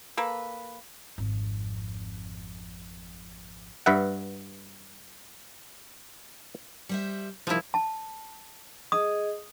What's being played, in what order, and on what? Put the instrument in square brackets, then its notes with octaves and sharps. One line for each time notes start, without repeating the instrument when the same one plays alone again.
[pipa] A#3 A4 B4
[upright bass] G#1 F2
[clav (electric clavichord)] G2 B4 E5 F#5
[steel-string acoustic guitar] G3 C5 E5
[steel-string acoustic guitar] C3 D#3 G3 [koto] F3 E4
[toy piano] A5
[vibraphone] G#4 D#5 [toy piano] D#6